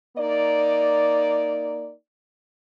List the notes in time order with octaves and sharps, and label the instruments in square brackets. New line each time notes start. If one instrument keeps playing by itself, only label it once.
[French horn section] A#3 D#4 D5